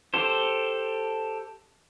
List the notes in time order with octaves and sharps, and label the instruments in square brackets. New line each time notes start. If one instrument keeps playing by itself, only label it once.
[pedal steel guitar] G4 A4 C5